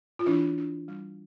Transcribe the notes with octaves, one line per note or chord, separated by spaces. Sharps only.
F4
E3 D4 E4
D4
G3